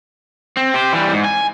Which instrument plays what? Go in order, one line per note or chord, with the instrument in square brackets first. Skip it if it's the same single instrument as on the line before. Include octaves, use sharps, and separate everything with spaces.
[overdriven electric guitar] C4
G4 C5
E3 G3
G#2
G#5